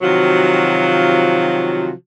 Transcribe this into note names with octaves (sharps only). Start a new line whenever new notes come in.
C3 D#3 F3 F#3 F4 F#4